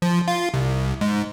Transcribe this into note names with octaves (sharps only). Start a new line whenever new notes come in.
F3
F4
C2
G#2